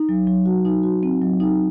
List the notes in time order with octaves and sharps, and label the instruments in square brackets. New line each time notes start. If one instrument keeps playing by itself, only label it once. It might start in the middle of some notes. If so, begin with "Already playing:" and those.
Already playing: [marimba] D#4
F#3
F#3
F#4
D#4
F#4
C4
F#3
D#4